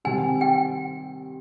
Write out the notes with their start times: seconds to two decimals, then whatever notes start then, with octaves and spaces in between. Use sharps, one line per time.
0.04 C3 D#3 G3 C4 G#5
0.41 G5